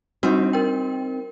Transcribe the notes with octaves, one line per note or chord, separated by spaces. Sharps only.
G3 C4 D4 D#4 F#4
A#4 G5